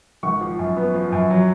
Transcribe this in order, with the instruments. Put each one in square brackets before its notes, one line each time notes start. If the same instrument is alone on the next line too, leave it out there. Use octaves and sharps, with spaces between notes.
[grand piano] G#1 C#6
F3
F#2
B3
F3
F#2
F#3